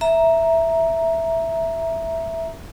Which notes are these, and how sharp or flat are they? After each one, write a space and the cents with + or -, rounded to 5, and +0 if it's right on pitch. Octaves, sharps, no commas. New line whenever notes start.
E5 +0 A#5 +0